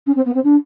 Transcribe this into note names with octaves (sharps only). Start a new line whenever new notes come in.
C#4
C4
B3
C4
D4